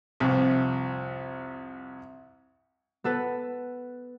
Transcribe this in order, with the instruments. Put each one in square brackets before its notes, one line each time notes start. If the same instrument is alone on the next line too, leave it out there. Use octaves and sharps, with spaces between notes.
[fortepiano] C2 F2
[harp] B3 A4 B4